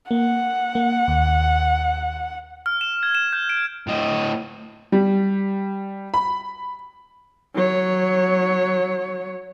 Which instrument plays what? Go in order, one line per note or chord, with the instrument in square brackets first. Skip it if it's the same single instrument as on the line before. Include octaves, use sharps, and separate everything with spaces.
[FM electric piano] A#3 [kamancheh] F#5
[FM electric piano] A#3
D#2
[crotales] F6
E7
G#6
E7
G6
D7
[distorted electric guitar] A2 D#5
[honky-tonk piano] G3
B5
[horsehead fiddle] F#3 C#5